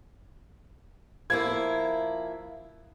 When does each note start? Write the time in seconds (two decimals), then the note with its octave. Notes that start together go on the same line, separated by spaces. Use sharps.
1.30 F3 A#3 E4 G#6